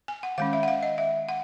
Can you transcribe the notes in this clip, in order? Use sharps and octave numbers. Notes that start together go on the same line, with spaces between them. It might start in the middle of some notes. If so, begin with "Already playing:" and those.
G#5
F#5
D#3 G#3 C#4 F5
E5
F#5
F5
D#5
E5
F#5